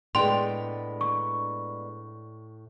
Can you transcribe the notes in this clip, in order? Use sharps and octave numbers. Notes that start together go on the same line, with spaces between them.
A2 G#3 B3 D4 D5 G5 C6
C#6